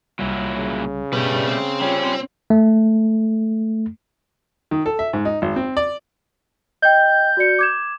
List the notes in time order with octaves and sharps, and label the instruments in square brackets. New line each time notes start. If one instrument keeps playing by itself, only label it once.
[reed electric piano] C2 G3 [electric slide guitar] A#2 F#3 E4
[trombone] C#3
[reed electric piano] B2 B3 [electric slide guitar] G3 A3 [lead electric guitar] G4 B4
[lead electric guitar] C4
[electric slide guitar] G3 C#4 [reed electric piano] F4 C#5 G5
[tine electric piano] A3
[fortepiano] D#3
A4
E5
G#2
D#4
G#1
C4
D5
[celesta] D#5 G5 [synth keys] G6
[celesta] F#4 D5 C#7
D6 G#6 E7